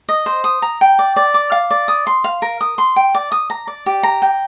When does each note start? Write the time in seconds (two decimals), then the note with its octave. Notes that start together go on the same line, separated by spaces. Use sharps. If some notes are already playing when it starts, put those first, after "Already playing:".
0.09 D#5
0.26 C5
0.44 D#6
0.62 A#5
0.81 G5
0.99 D5
1.16 D5
1.34 D6
1.52 F5
1.71 D5
1.88 D#6
2.07 C6
2.24 F5
2.42 A#4
2.61 D#6
2.78 C6
2.96 G5
3.15 D5
3.32 D#6
3.50 A#5
3.67 D5
3.86 G4
4.03 A#5
4.22 G5